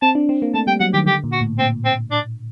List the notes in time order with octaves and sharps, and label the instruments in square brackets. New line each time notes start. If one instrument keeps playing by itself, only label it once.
[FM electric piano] C4 [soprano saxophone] A5
[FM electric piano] D4
C4
A#3
[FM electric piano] A3 [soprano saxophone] A5
[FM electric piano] G3 [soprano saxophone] G5
[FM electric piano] F#3 [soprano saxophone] F#5
[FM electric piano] D#3 [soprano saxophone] G4
[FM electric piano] D3 [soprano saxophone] G4
[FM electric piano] A#2
[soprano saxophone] F#4
[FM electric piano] A2
[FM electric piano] A#2 [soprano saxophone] C4
[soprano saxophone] C4
D4